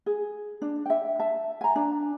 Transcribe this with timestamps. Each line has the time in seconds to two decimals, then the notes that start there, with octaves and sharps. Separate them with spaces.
0.06 G#4
0.62 D4
0.86 E5 G5
1.20 E5 A5
1.61 G#5 A#5
1.76 D4